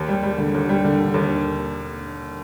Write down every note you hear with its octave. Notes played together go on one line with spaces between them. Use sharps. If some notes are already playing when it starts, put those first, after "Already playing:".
Already playing: D#2
G3
G3
D3
D#2
G3
D3
D3
D#2